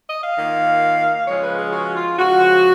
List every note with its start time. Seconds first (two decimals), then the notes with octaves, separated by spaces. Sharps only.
0.09 D#5
0.24 F5
0.38 D#3 A#3 F4
1.28 C#3 F3 G#3 C#4 F4 C#5
1.43 B4
1.58 G#4
1.72 F#4
1.95 F4
2.18 C#3 F3 G#3 F#4